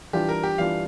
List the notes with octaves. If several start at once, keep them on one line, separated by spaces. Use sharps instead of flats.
E3 G3 D4 F4 G4
A#4
G4
E3 G3 D4 F4 F5